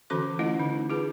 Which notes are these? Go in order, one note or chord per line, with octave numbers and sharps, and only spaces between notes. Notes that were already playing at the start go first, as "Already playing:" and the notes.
D3 E3 C#4 F#4 A4 D6
A3 C#4 E4 F4 D#5
D3 D#4
F4 G#4 B4